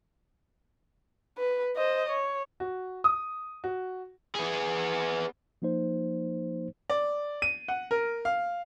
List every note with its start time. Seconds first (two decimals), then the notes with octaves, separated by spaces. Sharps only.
1.38 B4
1.76 C5 D#5
2.09 C#5
2.60 F#4
3.04 D#6
3.64 F#4
4.35 B3 G#4
5.62 F3 A#3 D#4 C5
6.90 D5
7.42 D#7
7.68 F#5
7.91 A#4
8.25 F5